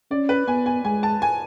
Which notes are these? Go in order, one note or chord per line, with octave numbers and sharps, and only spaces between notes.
C#4 D5
B4
B3 G#5
G#5
G#3 G#5
A5
G#5